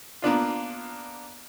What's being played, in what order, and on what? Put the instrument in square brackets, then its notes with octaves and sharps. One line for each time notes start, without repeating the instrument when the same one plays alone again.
[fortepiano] A#3 B3 D4 F4